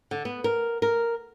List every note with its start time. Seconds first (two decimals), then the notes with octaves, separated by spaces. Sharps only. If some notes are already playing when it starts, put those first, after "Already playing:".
0.11 D3
0.25 B3
0.44 A#4
0.82 A#4